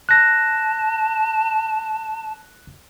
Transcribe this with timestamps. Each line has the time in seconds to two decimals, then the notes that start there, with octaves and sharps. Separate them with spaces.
0.09 A5 F#6 A#6